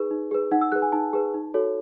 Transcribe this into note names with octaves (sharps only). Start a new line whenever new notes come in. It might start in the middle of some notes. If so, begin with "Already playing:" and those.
Already playing: D#4 G#4 B4
D#4
G#4 B4
D#4 F#5
E6
G#4 B4 F#6
G#5
D#4 A5
G#4 B4
D#4
F#4 A4 C#5